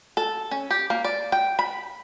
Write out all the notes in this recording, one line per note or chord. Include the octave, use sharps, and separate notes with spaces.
A4
C#4
G4
A#3
D5
G5
B5